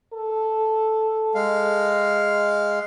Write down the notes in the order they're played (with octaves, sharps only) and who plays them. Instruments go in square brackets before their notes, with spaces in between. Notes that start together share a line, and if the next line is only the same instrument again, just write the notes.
[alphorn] A4
[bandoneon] G#3 F5